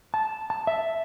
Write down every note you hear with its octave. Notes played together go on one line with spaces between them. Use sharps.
A5
A5
E5